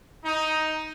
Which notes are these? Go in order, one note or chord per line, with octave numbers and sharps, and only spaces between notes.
D#4